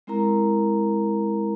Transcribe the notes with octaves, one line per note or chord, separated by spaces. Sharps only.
G#3 C4 E4 A#4 A#5